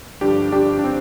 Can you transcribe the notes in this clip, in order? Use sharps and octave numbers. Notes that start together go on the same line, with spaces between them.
G2 D3 F3 D4 G4
D4 G4
D4
C4